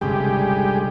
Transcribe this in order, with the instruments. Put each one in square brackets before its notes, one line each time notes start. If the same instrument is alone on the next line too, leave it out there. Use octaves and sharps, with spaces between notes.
[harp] G1 C2 C#4 [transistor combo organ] G3 G#3 G4